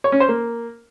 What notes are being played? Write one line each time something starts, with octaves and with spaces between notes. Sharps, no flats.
C#5
C#4
C5
A#3